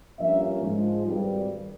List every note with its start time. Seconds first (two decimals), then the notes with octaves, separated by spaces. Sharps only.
0.19 G2 F3 A#3 C#4 E5
0.62 G#2 F3 G#3
1.05 G#1 G2 G3